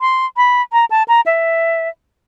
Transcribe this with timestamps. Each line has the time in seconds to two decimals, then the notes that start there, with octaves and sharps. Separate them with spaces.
0.01 C6
0.37 B5
0.73 A#5
0.91 A5
1.08 A#5
1.26 E5